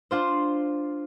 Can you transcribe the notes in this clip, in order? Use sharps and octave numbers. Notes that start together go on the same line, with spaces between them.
D4 F4 C5